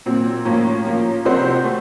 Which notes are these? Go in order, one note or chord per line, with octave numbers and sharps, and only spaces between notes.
A#2 F#3 C4
A2 F3 A#3 C#4
F3 A#3 C#4
C3 F3 C4 F#4 C5
A3